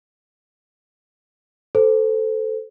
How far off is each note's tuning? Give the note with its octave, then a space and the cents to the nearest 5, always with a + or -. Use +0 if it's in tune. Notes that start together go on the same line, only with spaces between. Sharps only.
A4 +0 C5 -20